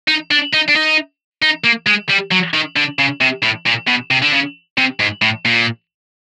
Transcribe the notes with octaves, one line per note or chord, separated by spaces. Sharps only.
D#4
D4
D#4
D4
D#4
D#4
A#3
G#3
G3
F#3
D#3
D3
C#3
C3
A2
A#2
B2
C3
D3
C#3
C3
G#2
A2
A#2